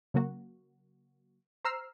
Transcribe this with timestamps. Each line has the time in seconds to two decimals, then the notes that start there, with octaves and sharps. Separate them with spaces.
0.14 C#3 F#3 A#3 F#4
1.65 C5 A#5 E6 F6 C7